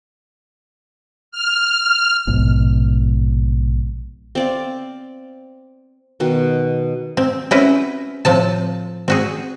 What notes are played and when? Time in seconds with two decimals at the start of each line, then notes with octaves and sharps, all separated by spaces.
1.32 F6
2.27 A#1 G#2 B2
4.35 C4 D5 F5
6.20 B2 D#3
7.17 C4
7.51 C4 C#4 E4 F#4 B4
8.25 A2 F3 C4 A5
9.08 C4 F#4 G#4